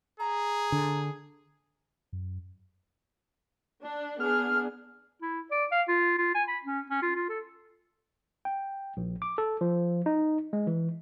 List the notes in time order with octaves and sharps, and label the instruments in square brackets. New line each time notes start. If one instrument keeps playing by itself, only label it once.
[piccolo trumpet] G#4 [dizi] A#5
[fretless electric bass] D3
[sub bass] F#2
[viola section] D4
[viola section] B3 D4 G#4 [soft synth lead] F6
[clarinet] E4
D5
F5
F4
F4
G#5
B5
C#4
C#4
F4
F4
A4
[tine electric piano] G5
A#1
D6
A4
F3
D#4
G#3
E3